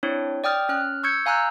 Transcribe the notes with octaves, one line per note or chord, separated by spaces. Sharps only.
C4 D4 E4 C#5
D5 G5 D#6 F6 A6
C#4 F6 F#6
C#6 E6 G6 G#6 C#7
F5 G#5 A#5 E6 F#6 G6